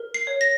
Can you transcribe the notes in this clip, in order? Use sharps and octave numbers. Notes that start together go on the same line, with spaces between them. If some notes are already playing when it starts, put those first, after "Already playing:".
Already playing: A#4
C7
C#5
A#6